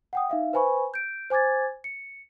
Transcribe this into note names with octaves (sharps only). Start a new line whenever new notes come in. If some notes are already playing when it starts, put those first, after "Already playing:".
F#5 G5 D#6
D#4 E5 F5
B4 C5 G#5 B5 C#6
G6 D7
C5 G#5 D6 G#6 A6
C#7